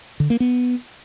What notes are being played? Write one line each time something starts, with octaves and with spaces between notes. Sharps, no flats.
D3
A#3
B3